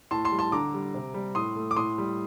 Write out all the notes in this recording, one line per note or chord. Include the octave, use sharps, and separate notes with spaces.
A2 A5 C6
A5 C6
G3
A5 C6
D3 A#5 D6
G3
C3
G3
A2 C6 D#6
A3
D6
A2 C6 D#6
G3